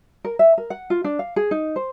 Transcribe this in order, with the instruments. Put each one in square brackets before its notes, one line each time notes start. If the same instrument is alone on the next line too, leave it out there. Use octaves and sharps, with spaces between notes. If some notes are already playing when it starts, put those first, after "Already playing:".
[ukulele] A#4
E5
A#4
F#5
F4
D4
F5
G#4
D#4
C5